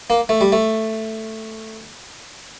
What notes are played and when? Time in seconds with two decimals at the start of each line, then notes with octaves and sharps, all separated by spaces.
0.10 A#3
0.29 A3
0.41 G3
0.52 A3